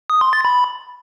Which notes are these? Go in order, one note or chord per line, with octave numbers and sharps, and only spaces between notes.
D#6
C6
A6
B5